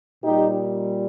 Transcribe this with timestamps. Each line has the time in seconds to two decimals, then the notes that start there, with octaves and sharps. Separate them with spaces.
0.23 A#2 G3 D#4 G4